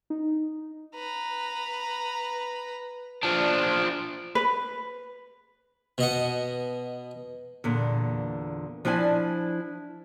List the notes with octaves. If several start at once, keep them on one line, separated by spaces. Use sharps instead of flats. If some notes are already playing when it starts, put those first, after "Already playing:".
D#4
B4 A#5
F3 D4
B4
B2 D#5 F#5
E2 A#2 D3
F3 D4 E4 D5 G#5